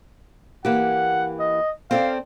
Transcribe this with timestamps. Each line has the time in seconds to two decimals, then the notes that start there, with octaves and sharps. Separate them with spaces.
0.65 E3 A#3 G4 F#5
1.39 D#5
1.91 C4 A4 D5 F5